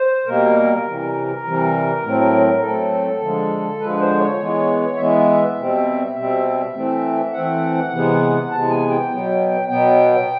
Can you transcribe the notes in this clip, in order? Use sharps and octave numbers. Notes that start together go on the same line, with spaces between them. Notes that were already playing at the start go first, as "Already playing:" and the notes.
Already playing: C5
B2 G3 A#3 A#4
C3 E3 G3
C3 E3 G3
A2 F#3 A3 C4
A2 F#3 A3 C4 A4
D3 F3 G#3
D3 F3 G#3 B4
C5
C#5
E3 G#3 B3
E3 G#3 B3 E5
B2 G3 C4
B2 G3 C4
E3 A3 C4
E3 A3 C4 F#5
C3 E3 G#3 B3
C3 E3 G#3 B3 A5
G#5
G5
B2 F#3 B3
B2 F#3 B3 G5